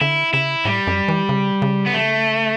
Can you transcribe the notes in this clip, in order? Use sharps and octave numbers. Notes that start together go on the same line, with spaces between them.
D3 E4
C#3 E4
A2 G3
F#2
E3
C#3
C#3
B3
A3